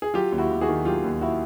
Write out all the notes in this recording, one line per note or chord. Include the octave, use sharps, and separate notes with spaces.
G#4
F#3 F4 G4
D#2
E4 F#4
D#2
F#4 G#4
D#3
F#3 F4 G4
D#2
E4 F#4